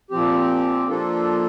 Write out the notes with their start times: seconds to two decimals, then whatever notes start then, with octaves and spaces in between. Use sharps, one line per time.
0.11 A#2 F3 C4 G4
0.88 F3 A#3 D4 F4 A4